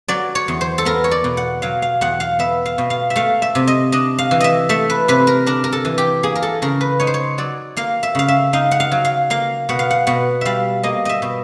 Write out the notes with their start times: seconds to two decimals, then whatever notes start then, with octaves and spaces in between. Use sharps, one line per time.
0.08 F#3 D5
0.35 C#5
0.48 E2
0.61 C5
0.78 A4
0.85 B3 A#4
1.04 C#5
1.11 D5
1.24 B2
1.37 F#5
1.62 F#3 F5
1.82 F5
2.01 E2 F#5
2.20 F5
2.39 B3 E5
2.65 F5
2.78 B2
2.90 F5
3.10 E5
3.16 A3 F5
3.42 E5
3.55 C3
3.67 D#5
3.92 D4 D#5
4.19 F5
4.31 E3
4.40 D#5 E5
4.69 A3 E5
4.90 B4
5.08 C3 B4
5.27 A#4
5.46 D4 A#4
5.64 A#4
5.72 A4
5.85 E3
5.98 G4
6.23 A#3 G#4
6.35 A#4
6.42 A4
6.62 C#3 A#4
6.81 B4
7.00 D#4 C#5
7.07 C5
7.14 C#5
7.38 F#3 D5
7.77 A#3 F5
8.03 E5
8.15 C#3 F5
8.28 E5
8.53 D#4 F5
8.71 F#5
8.80 F5
8.91 F#3
9.05 F5
9.30 A#3 F5
9.69 B2 F#5
9.79 F5
9.91 F#5
10.07 B2 F#5
10.41 G3 E5 F5
10.83 A#3 D#5
11.05 D#5 E5
11.22 B2